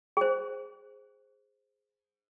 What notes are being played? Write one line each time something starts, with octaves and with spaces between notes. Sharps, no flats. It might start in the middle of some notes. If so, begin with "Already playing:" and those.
G#4 C5